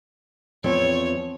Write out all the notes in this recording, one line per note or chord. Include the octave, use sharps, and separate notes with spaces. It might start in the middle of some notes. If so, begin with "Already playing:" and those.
E2 F3 C4 C#5